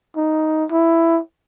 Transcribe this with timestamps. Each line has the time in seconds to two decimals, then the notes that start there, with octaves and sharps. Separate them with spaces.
0.16 D#4
0.71 E4